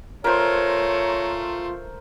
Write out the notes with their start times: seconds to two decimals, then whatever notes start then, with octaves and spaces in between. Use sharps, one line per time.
0.24 A3 F4 A#4 C5 C#5 A#5 C6